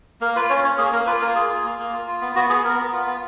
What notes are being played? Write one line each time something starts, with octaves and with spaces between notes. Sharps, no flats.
A#3 A#4
F4 B4
C#4 C#5
C#4 C#5
A#3 G#4
A#3 A#4
F4 B4
A#3 A#4
F4 G#4
F4
A#3
A#3
F4
F4
B3
B3 F#4
B3 G#4
B3 A#4
B3
F4
B3